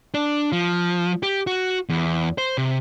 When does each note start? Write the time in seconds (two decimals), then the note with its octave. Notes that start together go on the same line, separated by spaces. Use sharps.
0.14 D4
0.52 F3
1.23 G4
1.47 F#4
1.89 E2
2.38 C5
2.58 C3